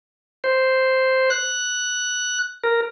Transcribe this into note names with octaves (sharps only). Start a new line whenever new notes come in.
C5
F#6
A#4